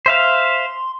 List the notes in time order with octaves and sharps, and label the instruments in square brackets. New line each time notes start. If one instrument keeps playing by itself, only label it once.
[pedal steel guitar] C5 E5 F5 [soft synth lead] C6